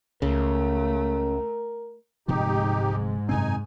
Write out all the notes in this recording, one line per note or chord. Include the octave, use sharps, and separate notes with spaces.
C#2 C#3 A3 A#4
D1 G#2 C3 F3 D#4 G4
F#2 C3 C4 D#4 G#5